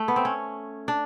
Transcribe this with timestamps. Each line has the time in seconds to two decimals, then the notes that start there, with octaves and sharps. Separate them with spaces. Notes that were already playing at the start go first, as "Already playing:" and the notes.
Already playing: A3
0.08 B3
0.16 C4
0.25 C#4
0.88 D4